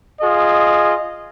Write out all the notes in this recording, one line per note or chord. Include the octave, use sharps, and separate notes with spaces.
F4 G#4 D#5